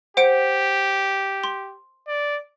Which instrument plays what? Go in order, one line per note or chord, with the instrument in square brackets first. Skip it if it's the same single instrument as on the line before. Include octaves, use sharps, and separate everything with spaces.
[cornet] G4 [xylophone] C5 F#5 D7
[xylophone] C6
[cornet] D5